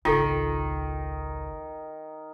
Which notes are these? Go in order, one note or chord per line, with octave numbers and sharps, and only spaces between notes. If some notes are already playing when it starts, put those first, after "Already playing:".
G#1 C#2 D#3 F4 A4